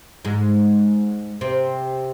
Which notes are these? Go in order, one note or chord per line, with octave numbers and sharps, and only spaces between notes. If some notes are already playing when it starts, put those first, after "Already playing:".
G#2 G#3
C3 C4